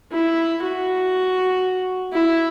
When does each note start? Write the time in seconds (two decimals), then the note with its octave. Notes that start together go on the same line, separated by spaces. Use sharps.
0.12 E4
0.62 F#4
2.13 E4